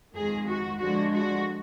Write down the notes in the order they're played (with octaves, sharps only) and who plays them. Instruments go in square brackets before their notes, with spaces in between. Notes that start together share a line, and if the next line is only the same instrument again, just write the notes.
[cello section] F2 D#3 G#3 G#4
F#4
D3 F3 G#3 D4 F#4
F#4